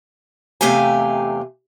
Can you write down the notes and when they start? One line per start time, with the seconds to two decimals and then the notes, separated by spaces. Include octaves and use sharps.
0.61 E2 C3 A3 G4 F5 G#5